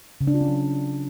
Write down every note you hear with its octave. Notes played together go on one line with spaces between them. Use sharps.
C#3
D4
F4
C#4
F#3